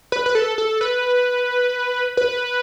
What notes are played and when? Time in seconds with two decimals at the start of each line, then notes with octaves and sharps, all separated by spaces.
0.12 B4
0.26 B4
0.35 A4
0.58 A4
0.81 B4
2.17 B4